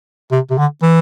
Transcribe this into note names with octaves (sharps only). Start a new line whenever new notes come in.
C3
C3
D3
E3